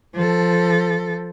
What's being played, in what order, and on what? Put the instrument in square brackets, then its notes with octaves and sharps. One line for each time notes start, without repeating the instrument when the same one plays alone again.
[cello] F3 A4